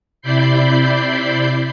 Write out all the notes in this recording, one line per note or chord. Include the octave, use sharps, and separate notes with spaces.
C3 E4 D5 B5 G6 C7